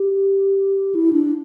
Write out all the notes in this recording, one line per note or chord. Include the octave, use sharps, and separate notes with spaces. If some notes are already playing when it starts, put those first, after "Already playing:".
Already playing: G4
E4
D4